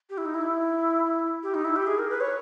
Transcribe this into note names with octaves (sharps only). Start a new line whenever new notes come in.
G4
E4
D#4
E4
G4
D#4
E4
G4
G#4
A#4
B4
C#5